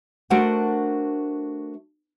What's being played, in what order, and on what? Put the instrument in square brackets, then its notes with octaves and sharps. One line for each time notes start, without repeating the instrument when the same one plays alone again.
[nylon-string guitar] A3 D4 F#4 A#4 C5 F#5